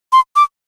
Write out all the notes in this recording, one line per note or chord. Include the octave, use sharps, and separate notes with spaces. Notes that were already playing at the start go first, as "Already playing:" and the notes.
C6
D6